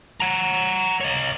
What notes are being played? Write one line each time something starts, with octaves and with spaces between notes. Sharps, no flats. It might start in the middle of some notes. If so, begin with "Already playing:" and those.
F#5 A#5
C#5 D#5